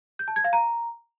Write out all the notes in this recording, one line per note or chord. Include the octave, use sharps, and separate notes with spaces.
G6
A5
G#6
F5
A#5